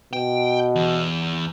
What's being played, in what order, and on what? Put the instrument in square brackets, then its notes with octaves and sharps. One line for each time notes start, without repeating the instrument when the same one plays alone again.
[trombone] B2 [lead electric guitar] G5
[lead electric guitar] E2